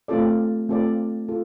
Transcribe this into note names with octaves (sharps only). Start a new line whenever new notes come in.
A3 C4 F4 A4 D5
A3 C4 F4 A4 D5
F4 A4